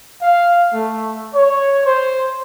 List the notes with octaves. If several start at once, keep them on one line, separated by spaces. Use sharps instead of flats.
F5
A3
C#5
C5